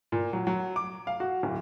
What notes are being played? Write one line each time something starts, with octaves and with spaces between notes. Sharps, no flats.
A#2
F#3
F#3
D6
F5
F#4
D1